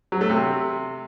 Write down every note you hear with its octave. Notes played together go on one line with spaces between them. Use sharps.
F#3
A3
C3